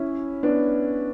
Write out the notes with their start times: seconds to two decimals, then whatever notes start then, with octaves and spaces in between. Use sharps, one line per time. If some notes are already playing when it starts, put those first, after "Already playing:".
Already playing: C#4 E4
0.43 B3 D4